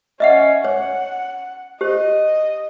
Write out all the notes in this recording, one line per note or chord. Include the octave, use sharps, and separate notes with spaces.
C#4 D#5 E5 F#5
C#5 F#5
G4 C5 D#5